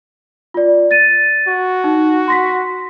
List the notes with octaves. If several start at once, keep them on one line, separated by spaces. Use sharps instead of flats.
F4 D5
A6 D#7
F#4
D#4
C6 A#6 B6